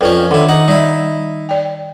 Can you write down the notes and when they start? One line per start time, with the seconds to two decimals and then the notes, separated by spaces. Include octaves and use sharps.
0.01 F2 F3 C#4 B4 D5 G5
0.31 D3 D#3 E4
0.49 D#4 F#5
0.68 G3 D#4 E4 D5
1.49 D5 G5